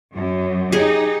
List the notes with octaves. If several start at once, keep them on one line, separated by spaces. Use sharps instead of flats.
F#2
D#4 G4 G#4